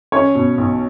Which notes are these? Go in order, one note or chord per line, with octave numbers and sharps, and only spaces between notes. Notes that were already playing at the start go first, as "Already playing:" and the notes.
C#4 C#5
B2
B1